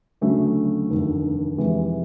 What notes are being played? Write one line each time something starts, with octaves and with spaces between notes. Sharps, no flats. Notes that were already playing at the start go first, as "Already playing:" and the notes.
D2 C#3 F#3 A3
F1 D#2 D3
F2 C3 E3 G#3